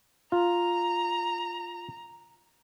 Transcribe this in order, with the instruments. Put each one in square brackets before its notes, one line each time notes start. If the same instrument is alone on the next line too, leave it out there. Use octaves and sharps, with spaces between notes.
[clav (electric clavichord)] F4 [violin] A#5